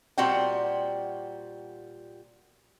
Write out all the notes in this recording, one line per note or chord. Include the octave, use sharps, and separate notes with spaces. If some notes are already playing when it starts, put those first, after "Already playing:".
A#2 G3 C4 F#4 F#5 G5